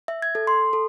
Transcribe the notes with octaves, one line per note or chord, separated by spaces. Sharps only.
E5
G#6
A4
C6
A4